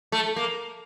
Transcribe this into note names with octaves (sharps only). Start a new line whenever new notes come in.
A3
A#3